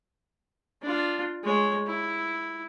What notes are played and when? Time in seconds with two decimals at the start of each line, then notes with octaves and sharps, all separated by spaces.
0.82 D4 F4
1.43 G#3 C#5
1.87 E4